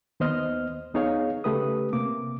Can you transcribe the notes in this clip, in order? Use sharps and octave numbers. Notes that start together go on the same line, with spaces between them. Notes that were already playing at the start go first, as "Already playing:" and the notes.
D#2 B3 C5 D#5 F6
D2 B3 D#4 G#4 C#5 F5
C#3 A3 G4 B4 D#6
C3 A#3 D6